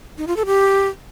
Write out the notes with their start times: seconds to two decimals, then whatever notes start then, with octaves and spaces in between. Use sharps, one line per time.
0.18 D#4
0.27 F4
0.36 A4
0.46 G4